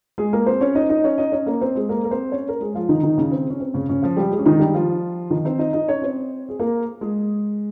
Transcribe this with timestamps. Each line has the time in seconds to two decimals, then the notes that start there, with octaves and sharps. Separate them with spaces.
0.18 G#3 G#4
0.33 A#3 A#4
0.46 C4 C5
0.61 C#4 C#5
0.75 D#4 D#5
0.89 D#4 D#5
1.04 C#4 C#5
1.18 D#4 D#5
1.32 C#4 C#5
1.46 A#3 A#4
1.61 C4 C5
1.75 G#3 G#4
1.89 A#3 A#4
2.04 A#4
2.11 C4 C5
2.32 C#4 C#5
2.49 A#4
2.61 G#3 G#4
2.74 F3 F4
2.89 D#3 D#4
3.03 D#3 D#4
3.17 C#3 C#4
3.31 C4
3.50 C#4
3.60 C4
3.74 C#3 C#4
3.89 C#3 C#4
4.02 F3 F4
4.16 G3 G4
4.31 G#3 G#4
4.39 C#4
4.46 D#3 D#4
4.59 G3 G4
4.74 F3 F4
5.30 D#3 D#4
5.45 C4 C5
5.59 D#4 D#5
5.73 D#4 D#5
5.88 C#4 C#5
6.02 C4 C5
6.49 G#4
6.60 A#3 A#4
7.01 G#3 G#4